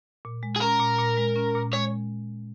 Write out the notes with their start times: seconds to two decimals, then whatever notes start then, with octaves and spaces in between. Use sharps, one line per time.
0.25 A#2
0.43 G#3
0.56 G#4
0.61 C#4 A#4
0.80 A#2
0.99 A#2
1.17 G#3
1.36 C#4
1.55 A#2
1.73 G#3 C#5